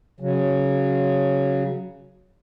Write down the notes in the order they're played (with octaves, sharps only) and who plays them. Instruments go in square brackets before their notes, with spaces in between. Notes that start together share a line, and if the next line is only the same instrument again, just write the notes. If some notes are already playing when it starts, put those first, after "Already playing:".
[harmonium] C#3 F#3